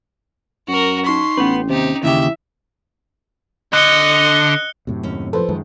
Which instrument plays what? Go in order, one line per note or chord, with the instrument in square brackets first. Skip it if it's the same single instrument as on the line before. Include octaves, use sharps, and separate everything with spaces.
[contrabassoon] F#2 [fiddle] F#4 A#4
[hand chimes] D#4 C#6 B6 [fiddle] C6
[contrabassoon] A1 [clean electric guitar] B3 B4 [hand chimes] C#4
[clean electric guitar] D#2 [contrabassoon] C3 [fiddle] D#4 G4
[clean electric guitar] D#2 C#3 G4 [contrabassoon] E3 [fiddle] E5
[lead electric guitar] D3 [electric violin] D#5 [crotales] F#6 C#7 G7
[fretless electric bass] F#2 A2 C3
[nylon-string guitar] D#2 C#4
[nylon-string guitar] F3 [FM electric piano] A4 B4 C5
[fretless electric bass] F#2 D#3 G#3